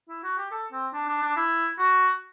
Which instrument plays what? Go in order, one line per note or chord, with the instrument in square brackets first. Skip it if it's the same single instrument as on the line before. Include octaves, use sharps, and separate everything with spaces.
[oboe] E4
F#4
G4
A4
C4
D4
D4
D4
E4
F#4